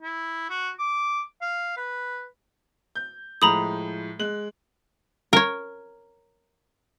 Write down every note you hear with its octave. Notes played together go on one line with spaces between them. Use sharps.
E4
F#4
D6
F5
B4
G6
A2 F3 G#3 A#5 B5 D#6
G#3 F#6 F#7
A#4 C#5